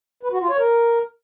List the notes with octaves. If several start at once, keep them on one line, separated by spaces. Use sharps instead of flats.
B4
F#4
F4
C#5
A#4